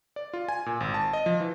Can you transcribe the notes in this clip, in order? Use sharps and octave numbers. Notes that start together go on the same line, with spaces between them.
D5
F4
G#5
A#2
G#1
A5
D#5
F3
E3